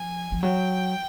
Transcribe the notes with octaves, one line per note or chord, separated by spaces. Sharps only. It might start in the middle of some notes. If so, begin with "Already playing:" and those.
Already playing: F3 G#5
F3
F#3 G5